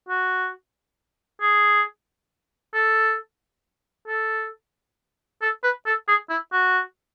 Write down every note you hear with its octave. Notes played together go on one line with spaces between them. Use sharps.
F#4
G#4
A4
A4
A4
B4
A4
G#4
E4
F#4